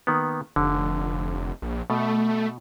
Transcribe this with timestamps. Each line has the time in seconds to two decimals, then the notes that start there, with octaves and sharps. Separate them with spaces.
0.07 D#3 A#3 B3
0.56 F1 D3
1.62 A#1
1.90 B2 A3